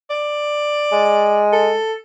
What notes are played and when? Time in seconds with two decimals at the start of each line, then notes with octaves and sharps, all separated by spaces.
0.10 D5
0.92 G#3
1.53 A4